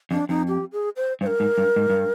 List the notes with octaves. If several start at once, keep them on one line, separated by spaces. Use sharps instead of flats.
F2 D4
F2 D#4
G4
G#4
C5
G2 C5
A#4
G#2
G2
G#2
G2